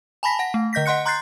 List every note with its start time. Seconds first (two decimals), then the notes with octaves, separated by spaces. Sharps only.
0.23 G#5 A5 B5 A#6 B6
0.39 F#5 A#6
0.54 A3
0.73 D3 D#5 G6 A#6 B6
0.86 D#5 F#5 C6 F#6 C#7
1.06 A#5 C6 F#6 G6 A6 C7